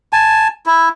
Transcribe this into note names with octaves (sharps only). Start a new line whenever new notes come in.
G#5 A5
E4